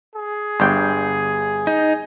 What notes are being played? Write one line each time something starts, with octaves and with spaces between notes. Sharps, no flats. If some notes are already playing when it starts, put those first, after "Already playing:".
G#4
G1 G2 G5
D#4